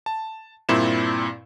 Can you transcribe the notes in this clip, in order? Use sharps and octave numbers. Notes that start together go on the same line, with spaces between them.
A5
G2 A#2 C4 E4 E7